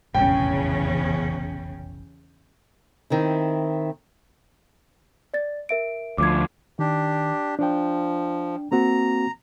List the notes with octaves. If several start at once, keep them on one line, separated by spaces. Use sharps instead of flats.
F1 A#1 E2 C#3 C#4 G5
D#3 C4 E4
D5 A6
A#4 E5 D7
D2 F3 D6 G#6
D#3 D4 G4
F3 D4 G5
A#3 C4 F#4 A#5